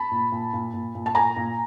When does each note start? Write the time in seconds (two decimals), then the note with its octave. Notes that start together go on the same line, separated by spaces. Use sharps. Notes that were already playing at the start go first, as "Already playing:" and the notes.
Already playing: A5 B5
0.11 A#2
0.32 A#2
0.53 A#2
0.74 A#2
0.95 A#2
1.06 A5
1.15 A#2 G#5 A#5
1.36 A#2